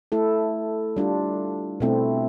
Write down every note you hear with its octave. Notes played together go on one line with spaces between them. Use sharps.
A3 E4 A4
G3 D4 F4
B2 A3 C4 E4